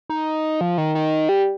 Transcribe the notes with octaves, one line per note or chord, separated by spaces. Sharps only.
D#4
F3
D#3
D#3
G3